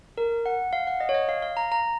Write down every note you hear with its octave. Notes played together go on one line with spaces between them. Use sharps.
A#4
F#5
F5
F#5
D#5
C#5
D#5
F5
F5
A#5
A#5